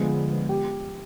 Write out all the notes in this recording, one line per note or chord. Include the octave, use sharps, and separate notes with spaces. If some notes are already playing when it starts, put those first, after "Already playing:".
Already playing: D3 F3 G#3 B3 G#4
G4